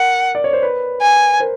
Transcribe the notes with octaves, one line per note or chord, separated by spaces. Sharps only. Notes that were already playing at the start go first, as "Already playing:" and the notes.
Already playing: A#4 F#5
D5
C#5
C5
B4
G#5
A#4 C5